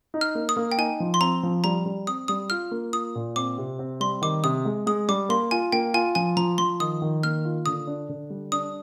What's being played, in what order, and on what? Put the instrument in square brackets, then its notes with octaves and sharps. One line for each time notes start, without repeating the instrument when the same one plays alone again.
[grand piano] D#4
[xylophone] F6
[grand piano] A#3
[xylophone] D#6
[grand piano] A#3
[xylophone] G5
[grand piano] D#4 [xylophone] G#5
[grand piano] F3
[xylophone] C6
[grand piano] C4 [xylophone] A#5
[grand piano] F3
[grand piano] G3 [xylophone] A#5
[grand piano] G3
[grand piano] C4 [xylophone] D#6
[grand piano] G3 [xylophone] D#6
[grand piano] F4 [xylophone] F6
[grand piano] A#3
[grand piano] F4 [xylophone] D#6
[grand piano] A#2
[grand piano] C4 [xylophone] D6
[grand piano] C3
C4
[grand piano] G3 [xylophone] C6
[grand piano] D#3 [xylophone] D6
[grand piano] C3 [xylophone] D#6
[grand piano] G#3
[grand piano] G#3 [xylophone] D#6
[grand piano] G3 [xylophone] D6
[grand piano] A#3 [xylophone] C6
[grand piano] F4 [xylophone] G#5
[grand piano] A#3 [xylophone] G5
[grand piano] F4 [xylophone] G#5
[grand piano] F3 [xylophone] G#5
[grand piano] F3 [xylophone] A#5
[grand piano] F3 [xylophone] C6
[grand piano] D#3 [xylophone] D#6
[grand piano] D#3
[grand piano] A#3 [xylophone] F6
[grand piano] F4
[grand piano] D3 [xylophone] D#6
[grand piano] D4
D3
G3
[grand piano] D4 [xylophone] D#6